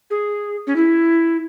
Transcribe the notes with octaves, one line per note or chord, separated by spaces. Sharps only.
G#4
C#4
E4